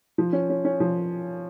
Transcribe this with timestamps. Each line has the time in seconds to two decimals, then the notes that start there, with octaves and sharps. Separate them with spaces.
0.18 F3
0.33 C#4
0.50 C#4
0.65 C#4
0.80 F3